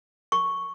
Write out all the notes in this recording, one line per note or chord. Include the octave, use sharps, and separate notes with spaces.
C#6